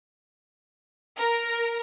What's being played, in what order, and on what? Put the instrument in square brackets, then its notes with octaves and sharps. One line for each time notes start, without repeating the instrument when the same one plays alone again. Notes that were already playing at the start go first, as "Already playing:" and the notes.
[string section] A#4